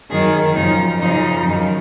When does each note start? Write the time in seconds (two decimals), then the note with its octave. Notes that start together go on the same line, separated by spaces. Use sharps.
0.10 F#2 D#3 G#4
0.54 F#2 C#3 F3 D#4
1.00 F#2 C#3 F3 D#4
1.45 F#2 D#3